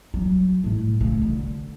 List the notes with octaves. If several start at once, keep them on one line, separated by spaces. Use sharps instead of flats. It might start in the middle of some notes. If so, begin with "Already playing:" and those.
F#3
A2
C#3 A3
D3